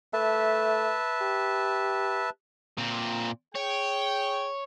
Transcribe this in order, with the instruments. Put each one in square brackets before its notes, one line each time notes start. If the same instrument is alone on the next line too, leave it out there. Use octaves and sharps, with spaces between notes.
[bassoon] A3 [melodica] B4 E5 A5
[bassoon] G4
[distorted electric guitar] A#2 C4
[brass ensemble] G#4 G5 [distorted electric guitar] C#5